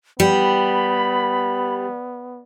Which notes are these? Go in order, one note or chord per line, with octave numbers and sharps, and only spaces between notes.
G3 B3 B5